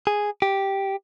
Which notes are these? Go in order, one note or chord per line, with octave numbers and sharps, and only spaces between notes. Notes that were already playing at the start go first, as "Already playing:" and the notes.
G#4
G4